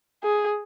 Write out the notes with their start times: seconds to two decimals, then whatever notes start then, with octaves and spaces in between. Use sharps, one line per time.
0.23 G#4